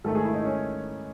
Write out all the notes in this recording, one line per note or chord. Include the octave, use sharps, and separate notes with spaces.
G#2 D#3 A3 A4
G#4
E4
D#4
C#4